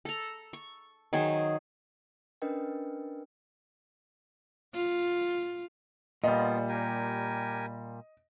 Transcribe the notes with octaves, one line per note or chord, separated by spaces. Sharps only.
A4 A#5
C#6
D#3 F#3 G#4 C5
C#4 D4 A#4 B4 D#5 G5
F4
A#2 G3 B3 F4 D#5
G4 A#4 G#5